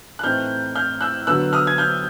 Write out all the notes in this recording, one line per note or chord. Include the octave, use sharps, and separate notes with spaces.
F#6
A2 E3 A3 C4 D#4 F6 G6
F6 G6
E6 F#6
D3 F#3 B3 E6 F#6
D#6 F6
G#6
F6 G6